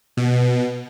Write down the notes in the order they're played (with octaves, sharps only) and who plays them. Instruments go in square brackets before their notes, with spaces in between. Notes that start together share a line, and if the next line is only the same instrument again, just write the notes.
[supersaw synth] B2